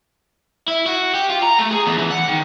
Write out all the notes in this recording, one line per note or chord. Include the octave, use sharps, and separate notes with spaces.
E4
F#4
G4
F4
A#5
A3
G#4
E2
E3
F#5
D#3